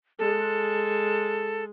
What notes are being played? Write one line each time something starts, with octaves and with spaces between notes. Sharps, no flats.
G#3 A4